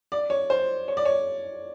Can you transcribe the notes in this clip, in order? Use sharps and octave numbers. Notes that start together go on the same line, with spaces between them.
D5
C#5
C5
C#5
D5
C#5